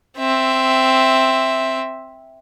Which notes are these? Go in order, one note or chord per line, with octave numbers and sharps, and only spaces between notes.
C4 E5